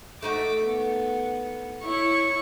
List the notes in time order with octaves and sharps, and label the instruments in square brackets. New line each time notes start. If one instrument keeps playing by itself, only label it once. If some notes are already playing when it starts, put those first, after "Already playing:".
[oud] A3 D#4 F#4 [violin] D6 B6
[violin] B3
[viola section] E4 [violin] C#5 C#6